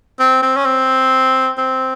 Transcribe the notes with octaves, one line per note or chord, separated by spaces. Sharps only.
C4
C4
C#4
C4
C4